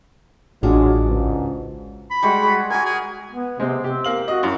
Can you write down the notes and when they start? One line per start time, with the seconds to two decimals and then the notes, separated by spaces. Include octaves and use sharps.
0.63 A1 F#3 G#3 D4 F4 F#4
1.06 C#2 G#2
2.11 B5
2.22 G3 G#3 F#4
2.43 G#4
2.70 F#4 A#4 G#5
2.85 G#4
3.32 B3
3.60 C3 G#3 C4
3.84 C4 G4
4.04 A#3 F5 F#7
4.28 F#4 D#5
4.43 F#2 E4